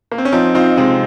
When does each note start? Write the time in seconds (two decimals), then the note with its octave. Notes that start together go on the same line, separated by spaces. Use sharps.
0.12 A#3
0.18 C4
0.25 C#4
0.33 F3 C4 D#4
0.55 C4 D#4 F4
0.77 C3 G#3 C4